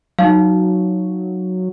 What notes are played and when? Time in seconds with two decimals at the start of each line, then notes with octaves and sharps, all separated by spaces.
0.19 F#3 D#4 F5